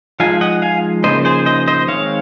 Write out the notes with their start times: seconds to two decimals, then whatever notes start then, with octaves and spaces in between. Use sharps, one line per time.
0.20 F3 G#3 D#4 F5 G#5
0.41 D#5 F#5
0.62 F5 G#5
1.04 C#3 F3 A#3 D#4 C5 D#5
1.25 G#4 C5
1.46 C5 D#5
1.68 C5 D#5
1.88 D#3 G#3 C4 C#5 F5